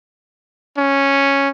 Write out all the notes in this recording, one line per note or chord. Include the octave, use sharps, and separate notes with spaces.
C#4